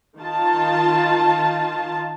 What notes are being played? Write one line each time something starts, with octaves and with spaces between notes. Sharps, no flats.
D#3 F4 A5